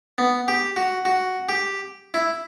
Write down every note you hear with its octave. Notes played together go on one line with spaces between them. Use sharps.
B3
G4
F#4
F#4
G4
E4